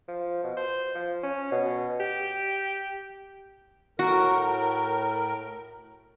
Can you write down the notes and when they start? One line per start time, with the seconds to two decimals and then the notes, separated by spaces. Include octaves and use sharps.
0.08 F3
0.44 B2
0.57 C5
0.95 F3
1.23 C#4
1.52 B2
2.00 G4
3.99 A2 F#4 A#4